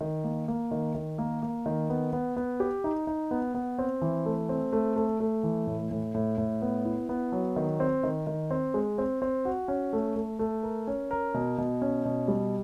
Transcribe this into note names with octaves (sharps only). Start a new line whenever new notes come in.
D#3
A#3
A#3
D#3
D#3
A#3
A#3
D#3
B3
B3
B3
G4
D#4
D#4
B3
B3
C4
E3
A3
C4
A3
A3
A3
E3
A2
A2
A2
A2
B3
E4
B3
F#3
D#3
C4
D#3
D#3
C4
G#3
C4
C4
F#4
C#4
A3
A3
A3
A#4
C#4
A#4
B2
B2
C#4
B2
G3